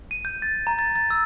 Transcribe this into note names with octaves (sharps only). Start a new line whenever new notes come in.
D#7
G6
A6
A#5
A6
A6
E6